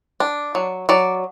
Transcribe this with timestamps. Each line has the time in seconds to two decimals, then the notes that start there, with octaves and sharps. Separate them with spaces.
0.20 D4
0.55 F#3
0.89 F#3 D5